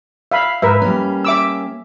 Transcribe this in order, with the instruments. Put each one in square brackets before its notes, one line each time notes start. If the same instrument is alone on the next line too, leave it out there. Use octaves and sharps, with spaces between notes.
[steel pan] E5 F5 B5
[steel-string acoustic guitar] G#2 [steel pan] A#4 B4 E5
[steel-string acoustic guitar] G3 A#3 C#4
[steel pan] E5 D6 E6